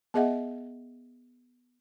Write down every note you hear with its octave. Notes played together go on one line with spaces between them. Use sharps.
B3 G#4 D#5 E5 F#5